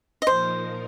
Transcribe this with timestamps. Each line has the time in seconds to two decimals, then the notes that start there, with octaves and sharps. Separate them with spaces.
0.22 D#5
0.26 A#2 F3 D#4 A#4 C5